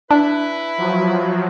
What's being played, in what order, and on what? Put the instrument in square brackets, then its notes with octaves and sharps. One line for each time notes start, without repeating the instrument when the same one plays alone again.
[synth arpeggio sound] D4 [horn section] E4 B4
[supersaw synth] F3 F#3